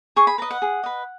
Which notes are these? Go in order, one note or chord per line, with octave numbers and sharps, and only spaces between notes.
G#4 C#6
B5
B4 D#5 A#5
F#5
G#4
B4 D#5